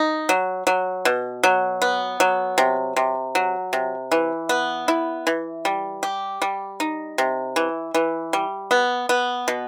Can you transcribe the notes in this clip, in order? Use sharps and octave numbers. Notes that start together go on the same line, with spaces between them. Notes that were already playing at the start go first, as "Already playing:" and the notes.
Already playing: D#4
F#3
F#3
B2
F#3
B3
F#3
C3
C3
F#3
C3
E3
B3
E4
E3
G3
G4
G3
D#4
C3
E3
E3
G3
B3
B3
B2